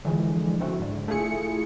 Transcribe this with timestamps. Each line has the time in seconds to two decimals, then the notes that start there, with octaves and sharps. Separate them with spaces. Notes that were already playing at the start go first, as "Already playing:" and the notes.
0.05 D3 E3 F3 G#3
0.60 C#3 A3 C4 E4 F#4
0.79 G#2 D3
1.08 A3 E4 F4 G#4 C#7